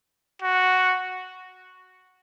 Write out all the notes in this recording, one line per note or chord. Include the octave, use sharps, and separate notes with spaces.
F#4